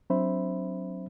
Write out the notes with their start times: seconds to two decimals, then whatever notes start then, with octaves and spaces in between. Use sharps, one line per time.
0.10 F#3 C4 D4 C5 E5 B5